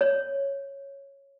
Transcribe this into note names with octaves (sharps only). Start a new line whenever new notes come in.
C#5